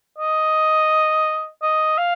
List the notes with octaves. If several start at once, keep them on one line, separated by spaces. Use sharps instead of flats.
D#5
D#5
F5